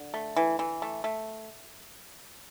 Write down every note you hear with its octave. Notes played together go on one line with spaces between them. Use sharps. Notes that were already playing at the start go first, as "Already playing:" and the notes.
Already playing: D3
A3
E3
E3
A3
A3